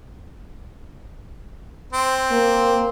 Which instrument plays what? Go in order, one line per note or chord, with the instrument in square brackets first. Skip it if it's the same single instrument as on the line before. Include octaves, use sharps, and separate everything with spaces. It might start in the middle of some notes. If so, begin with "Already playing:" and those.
[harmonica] C4
[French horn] A#3